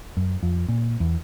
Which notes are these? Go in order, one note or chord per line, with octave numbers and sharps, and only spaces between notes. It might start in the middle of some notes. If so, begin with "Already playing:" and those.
F#2
F2
A#2
E2